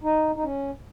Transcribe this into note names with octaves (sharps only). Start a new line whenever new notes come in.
D#4
D#4
C#4